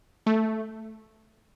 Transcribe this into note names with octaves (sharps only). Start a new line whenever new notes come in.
A3